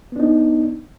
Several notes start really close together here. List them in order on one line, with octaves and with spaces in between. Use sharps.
B3 D4 D#4